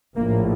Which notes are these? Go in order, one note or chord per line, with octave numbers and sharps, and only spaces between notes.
A#1 A2 A#3